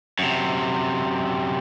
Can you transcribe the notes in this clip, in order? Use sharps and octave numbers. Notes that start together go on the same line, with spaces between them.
F#2 C3